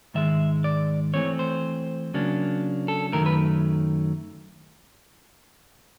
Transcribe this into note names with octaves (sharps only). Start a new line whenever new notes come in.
G#2 D#3 G#3 E5
D5
E3 A3 C4 C#5
C5
C#3 F#3 A#3 D4
A4
F#2 D#3 F#3 A3 A#4
B4